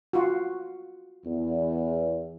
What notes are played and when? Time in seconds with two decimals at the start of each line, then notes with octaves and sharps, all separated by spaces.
0.13 F4 F#4
1.25 E2